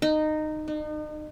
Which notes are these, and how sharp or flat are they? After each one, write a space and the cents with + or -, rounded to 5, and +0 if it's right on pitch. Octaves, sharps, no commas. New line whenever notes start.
D#4 -15
D#4 -40